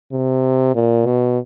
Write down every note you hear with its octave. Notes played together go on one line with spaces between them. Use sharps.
C3
A#2
B2